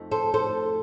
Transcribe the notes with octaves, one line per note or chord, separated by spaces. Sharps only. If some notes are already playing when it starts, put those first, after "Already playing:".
Already playing: F2 A3 D#4
A4 C5
A4 C5